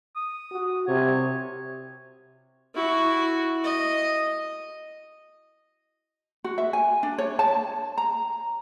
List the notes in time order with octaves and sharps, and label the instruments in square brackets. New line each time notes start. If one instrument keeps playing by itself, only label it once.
[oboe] D#6
[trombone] F#4
[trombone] C3 [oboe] C#5
[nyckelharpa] E4 F#4
D#5
[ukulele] F#4
E5
G#5
D4
C#5
A5
A#5